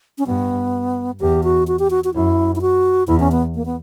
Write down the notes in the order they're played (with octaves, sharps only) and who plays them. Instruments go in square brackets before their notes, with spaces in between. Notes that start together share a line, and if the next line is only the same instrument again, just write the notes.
[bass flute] C#4
[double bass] G2 [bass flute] B3
[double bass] E2 [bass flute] G4
[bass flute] F#4
F#4
G4
F#4
F#4
[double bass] F#2 [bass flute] E4
[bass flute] E4
F#4
[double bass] E2 [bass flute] E4
[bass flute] C#4
B3
A#3
B3